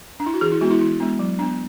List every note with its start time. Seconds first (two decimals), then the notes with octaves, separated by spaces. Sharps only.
0.20 D4
0.26 E4
0.34 F#4
0.41 E3 G#4
0.52 E4
0.61 G#3 B3 D4 F#4
0.70 E4
0.81 E3 E4
1.00 G#3 B3 D4
1.19 F#3
1.39 B3 D4